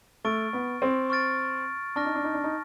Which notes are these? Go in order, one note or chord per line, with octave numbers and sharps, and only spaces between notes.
A3 C#6 F6 A6 D7
B3
C4
C#6 F6 A6 D7
D4 A5 C#6 F6 A#6
D#4
D4
D#4
D4
D#4